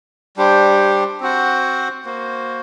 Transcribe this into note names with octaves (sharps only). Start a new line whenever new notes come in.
G3 D4 G4 C5
C4 F#4 C5 F#5
A#3 F#4 C5